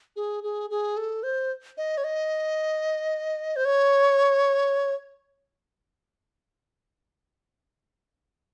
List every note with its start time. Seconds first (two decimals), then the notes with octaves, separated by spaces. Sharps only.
0.16 G#4
0.43 G#4
0.70 G#4
0.97 A4
1.23 C5
1.78 D#5
1.98 C#5
2.04 D#5
3.56 C5
3.65 C#5